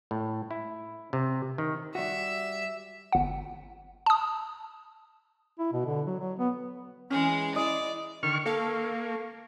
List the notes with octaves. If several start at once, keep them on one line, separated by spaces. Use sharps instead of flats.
A2
E4
C3
D#3
G3 F#4 E5
G1 F#5
A5 D#6
E4
B2
D3
F#3
F#3
B3
E3 G#3 C#4 G#4
E4 D5 D#5
D3 D#3 C#6 F6
A#3 A4 F5 C#6